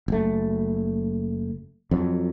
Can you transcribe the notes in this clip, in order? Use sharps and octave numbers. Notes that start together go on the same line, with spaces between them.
F#1 A3
F2 F#3